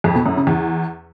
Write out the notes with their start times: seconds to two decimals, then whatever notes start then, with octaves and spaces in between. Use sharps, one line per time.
0.04 F2
0.15 B2
0.26 F#2
0.36 C#3
0.47 E2